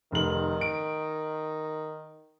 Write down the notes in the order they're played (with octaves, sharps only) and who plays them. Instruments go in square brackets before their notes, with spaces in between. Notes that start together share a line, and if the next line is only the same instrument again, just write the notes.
[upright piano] F1 F#7 [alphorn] D#3
[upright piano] D7